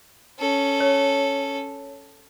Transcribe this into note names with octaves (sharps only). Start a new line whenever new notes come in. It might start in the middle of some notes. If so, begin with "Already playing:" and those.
C#4 A4
C#5